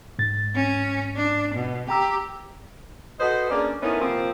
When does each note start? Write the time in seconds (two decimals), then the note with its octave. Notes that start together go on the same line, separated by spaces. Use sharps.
0.19 G#2 A6
0.55 C#4
1.16 D4
1.54 B2
1.89 G4 G5 A#5 E6
3.20 F#4 A4 B4 C5 D#5
3.50 A#3 C#4 D4 G#4 D5
3.82 A3 B3 C#4 D#4 E4 A#4
4.00 C3 F3 A#3 C4